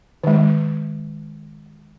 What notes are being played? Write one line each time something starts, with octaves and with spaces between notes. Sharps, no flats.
D#3 G#3